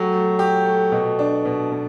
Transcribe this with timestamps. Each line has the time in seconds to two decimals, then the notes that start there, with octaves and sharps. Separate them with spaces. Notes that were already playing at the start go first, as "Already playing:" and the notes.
Already playing: F#3 A3 G4
0.13 A3
0.39 G4
0.65 A3
0.92 B2
1.19 D4
1.45 B2
1.72 B2